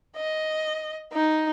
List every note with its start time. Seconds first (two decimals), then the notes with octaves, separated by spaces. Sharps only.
0.16 D#5
1.13 D#4